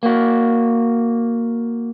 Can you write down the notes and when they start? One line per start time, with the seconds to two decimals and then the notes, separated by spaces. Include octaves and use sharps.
0.03 A#3 F#4